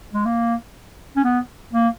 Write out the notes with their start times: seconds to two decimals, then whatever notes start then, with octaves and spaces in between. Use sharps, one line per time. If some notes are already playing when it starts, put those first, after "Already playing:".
0.13 G#3
0.25 A#3
1.16 C#4
1.24 B3
1.73 A#3